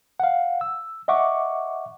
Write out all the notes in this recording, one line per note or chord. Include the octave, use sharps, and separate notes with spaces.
F5 F#5
E6
D#5 E5 F#5 C#6 D6